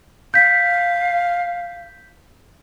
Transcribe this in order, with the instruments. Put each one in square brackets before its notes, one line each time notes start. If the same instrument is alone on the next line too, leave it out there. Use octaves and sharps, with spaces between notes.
[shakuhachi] F5 [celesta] G6 B6